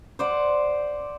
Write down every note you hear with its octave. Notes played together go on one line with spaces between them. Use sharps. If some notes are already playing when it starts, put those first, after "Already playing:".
C5 D5 F#5